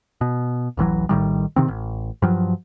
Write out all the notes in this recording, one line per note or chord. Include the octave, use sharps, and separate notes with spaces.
B2
D1 A1 E3 F#3
A#1 A2 D#3 G3
C3 D#3 C4
A1
G2 F3 F#3